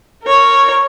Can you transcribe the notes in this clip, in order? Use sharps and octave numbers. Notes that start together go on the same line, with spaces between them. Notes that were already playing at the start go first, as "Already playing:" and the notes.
A#4 C#5